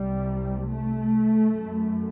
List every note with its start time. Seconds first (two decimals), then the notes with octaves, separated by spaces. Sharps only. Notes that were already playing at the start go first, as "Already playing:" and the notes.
Already playing: C2 C3 G3
0.67 A3
1.49 F#2